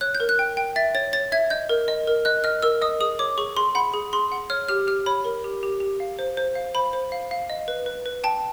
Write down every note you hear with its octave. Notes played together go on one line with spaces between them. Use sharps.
C#5 F#6
G6
A#4
F#6
G5
G5
E5 A6
C#5 A6
C#5 A6
E5 G#6
D#5 G6
A#4
D#5
A#4
D#5 F#6
D#5 F6
A#4 E6
D#5 D#6
G#4 D#6
C#5 D6
G#4 C#6
G#4 C6
F#5 B5
G#4
G#4 C6
F#5
C#5 F6
G4 F6
G4 F6
C#5 B5
A#4
G4
G4
G4
F5
C5
C5
F5
C5 B5
C5
F5
F5
D#5
B4
B4
B4
G5 A5